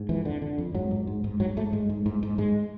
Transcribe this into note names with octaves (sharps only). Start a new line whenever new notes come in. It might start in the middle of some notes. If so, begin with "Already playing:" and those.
Already playing: G#2
F2 E3
D3
D3
F2
G#2 F#3
G#2
G#2
G#2
G#2 F#3
G#2 A3
G#2 G#3
G#2
G#2
G#2
G#2 G#3